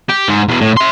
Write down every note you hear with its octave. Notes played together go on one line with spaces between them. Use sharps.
G4
G#2
E2 B2
A2
E5 C6